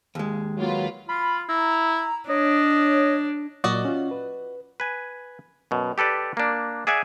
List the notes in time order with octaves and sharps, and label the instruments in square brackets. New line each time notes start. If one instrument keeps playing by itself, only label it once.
[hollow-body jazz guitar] D#2 G#3
[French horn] F#3 [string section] A#3 F4 B4
[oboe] F4 [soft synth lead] B5
[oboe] E4 [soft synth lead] A#5
[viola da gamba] D4 [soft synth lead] C#5 [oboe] D#5
[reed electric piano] A#2 F#3 [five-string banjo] F#4 D5 D#5
[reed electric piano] C#4 F4
B4
[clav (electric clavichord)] B4 G#5
F#2 B2
G4 A4 B4 D5
A#3 D4
G#4 D5 E5 F#5 G#5